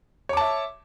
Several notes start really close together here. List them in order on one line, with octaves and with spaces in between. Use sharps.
C#5 D6 A5 E5